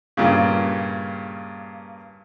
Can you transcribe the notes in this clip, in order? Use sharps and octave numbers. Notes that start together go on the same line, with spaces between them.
G2 A#2 C#3